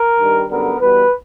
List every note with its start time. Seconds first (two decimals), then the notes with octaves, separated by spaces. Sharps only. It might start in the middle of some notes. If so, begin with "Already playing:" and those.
Already playing: A#4
0.19 G2 D#3 G3
0.49 F#2 D3 G3 B3 A#4
0.79 E2 B2 G3 B3 B4